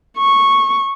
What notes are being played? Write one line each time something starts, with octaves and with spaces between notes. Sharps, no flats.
C#6